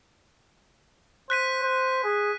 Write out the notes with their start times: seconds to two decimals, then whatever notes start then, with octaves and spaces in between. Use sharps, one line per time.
1.30 C5 F#6 B6 D#7
1.63 C5
2.04 G#4